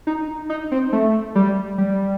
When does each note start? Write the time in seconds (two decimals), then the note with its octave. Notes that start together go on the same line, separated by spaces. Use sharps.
0.07 D#4
0.50 D#4
0.72 C4
0.92 A3
1.35 G3
1.78 G3